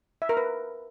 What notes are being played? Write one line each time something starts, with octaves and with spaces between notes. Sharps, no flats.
E5
A#4
B4